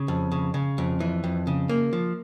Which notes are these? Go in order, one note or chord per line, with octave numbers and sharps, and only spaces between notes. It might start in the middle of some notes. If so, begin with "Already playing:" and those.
Already playing: C#3
F2
C#3
C#3
F2
E3
F2
C#3
A#3
F3